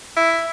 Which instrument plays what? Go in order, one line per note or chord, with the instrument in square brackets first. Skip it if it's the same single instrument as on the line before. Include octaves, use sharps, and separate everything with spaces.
[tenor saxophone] E4